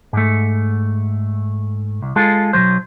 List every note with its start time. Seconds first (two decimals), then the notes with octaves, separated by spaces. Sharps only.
0.13 G#2 A3
2.02 C2
2.16 G#3 F4 A4
2.53 B1 A#2 F#3 C5